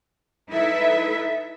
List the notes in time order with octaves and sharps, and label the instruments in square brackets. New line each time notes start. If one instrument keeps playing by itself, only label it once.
[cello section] D#4 E4 A4 B4 E5